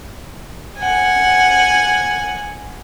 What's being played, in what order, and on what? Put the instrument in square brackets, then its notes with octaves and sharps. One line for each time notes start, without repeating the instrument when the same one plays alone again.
[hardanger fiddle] F#5 G#5